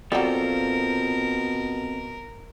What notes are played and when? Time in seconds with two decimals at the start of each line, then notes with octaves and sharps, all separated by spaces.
0.12 B2 F#3 G3 C4 F4 A4 A#4